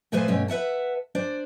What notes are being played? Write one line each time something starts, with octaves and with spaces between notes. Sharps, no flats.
A#2 F3 A3 G#4 B4 C5
G2 B2 A3 C#4
B4 E5 F#5 A5
D4 C5 D5